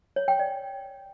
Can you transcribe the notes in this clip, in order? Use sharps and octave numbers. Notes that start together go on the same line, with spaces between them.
C#5
G5
D5